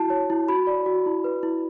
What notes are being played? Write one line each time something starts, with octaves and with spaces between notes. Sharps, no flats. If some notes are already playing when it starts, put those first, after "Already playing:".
Already playing: E4 F#4 A5
C#5
E4
F#4 B5
D5
F#4
E4
B4
E4